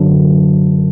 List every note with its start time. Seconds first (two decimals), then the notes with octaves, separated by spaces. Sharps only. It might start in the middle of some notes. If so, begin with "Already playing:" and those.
Already playing: F#2 D3 F#3